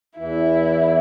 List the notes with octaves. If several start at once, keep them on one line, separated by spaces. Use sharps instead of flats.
E2 E3 E4